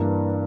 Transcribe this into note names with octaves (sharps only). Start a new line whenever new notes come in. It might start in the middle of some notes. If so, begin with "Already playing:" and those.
Already playing: G2 E3 A#3 D4